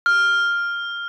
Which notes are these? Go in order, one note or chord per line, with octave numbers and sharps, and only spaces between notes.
F6